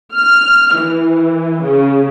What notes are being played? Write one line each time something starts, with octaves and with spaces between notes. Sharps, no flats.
F6
E3
C#3